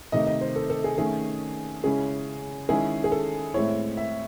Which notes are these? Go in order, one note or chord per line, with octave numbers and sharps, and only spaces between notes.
C3 D#3 A3 D#4 D#5
D#5
C5
A4
A4
G#4
D#3 A3 C#4 G#4
C#3 G#3 C#4 E4 G#4
D#3 G#3 C#4 E4 G#4
G#4
A4
A2 G#3 C4 E4 C#5
E5